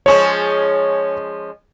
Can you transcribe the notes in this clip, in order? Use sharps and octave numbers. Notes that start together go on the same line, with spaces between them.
F3 G#3 C#4 C#5 C#6